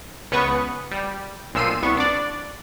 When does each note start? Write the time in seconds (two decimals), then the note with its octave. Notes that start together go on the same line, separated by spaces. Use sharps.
0.31 C#2 C#3 B3 B4 C#6 D#6
0.91 G3
1.54 B1 A#2 F3 E6 C7 D#7
1.82 C2 B3 C#6
1.97 D4 D5